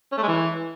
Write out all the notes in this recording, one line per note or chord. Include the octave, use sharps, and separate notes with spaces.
C#4
A3
G#3
E3